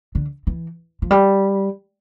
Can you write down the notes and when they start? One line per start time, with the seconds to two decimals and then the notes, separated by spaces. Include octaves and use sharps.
0.15 D3
0.47 E3
1.02 F3
1.11 G3